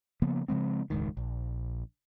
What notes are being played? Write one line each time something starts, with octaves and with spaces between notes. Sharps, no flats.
C#3 F3 A#3 B3
C#3 F3 G#3 C4
E1 C#2 G#2 D#3
A#1